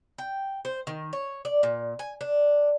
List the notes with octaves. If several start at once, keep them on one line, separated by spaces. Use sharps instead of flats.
G5
C5
D#3
C#5
D5
A#2
G#5
D4